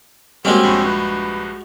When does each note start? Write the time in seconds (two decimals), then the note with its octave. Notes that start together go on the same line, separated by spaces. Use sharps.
0.45 G3 G#3 A#3 C4 C#4 F#4 G4
0.63 A#1 G2
0.86 B4